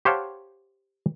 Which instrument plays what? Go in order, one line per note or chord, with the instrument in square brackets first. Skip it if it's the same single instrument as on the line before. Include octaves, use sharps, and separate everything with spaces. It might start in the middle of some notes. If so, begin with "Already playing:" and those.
[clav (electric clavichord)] G4 C5 C#5 F5 F#5 A5